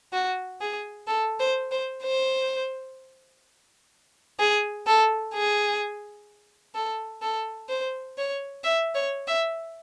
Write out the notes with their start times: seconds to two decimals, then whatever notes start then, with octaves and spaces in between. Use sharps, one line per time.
0.13 F#4
0.61 G#4
1.08 A4
1.40 C5
1.72 C5
2.03 C5
4.40 G#4
4.87 A4
5.34 G#4
6.75 A4
7.22 A4
7.69 C5
8.18 C#5
8.64 E5
8.95 C#5
9.28 E5